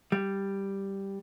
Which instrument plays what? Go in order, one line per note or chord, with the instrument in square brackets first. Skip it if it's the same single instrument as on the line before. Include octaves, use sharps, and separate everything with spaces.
[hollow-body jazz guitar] G3